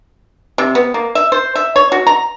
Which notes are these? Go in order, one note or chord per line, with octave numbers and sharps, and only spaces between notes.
C3
B3
A#3
E5
C5
E5
C#5
F#4
A#5